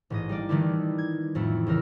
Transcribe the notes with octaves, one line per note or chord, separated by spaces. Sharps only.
A1 G#2 D#5
G3 A#3 D5
D#3 E3 G3 A3 D#4 E4
G#6
F2 A2 A3 E4
C#2 E3 A#4 E6